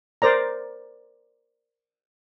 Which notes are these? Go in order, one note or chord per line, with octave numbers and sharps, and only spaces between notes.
A#4 C5 D5 A#5